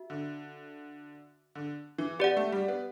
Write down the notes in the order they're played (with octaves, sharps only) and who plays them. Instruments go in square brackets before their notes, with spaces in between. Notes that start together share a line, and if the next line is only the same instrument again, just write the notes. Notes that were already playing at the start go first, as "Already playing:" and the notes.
Already playing: [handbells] F#4 E5
[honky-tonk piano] D3
D3
E3
[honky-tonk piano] B3 [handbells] G4 D5 F#5
[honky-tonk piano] A3
G3
B3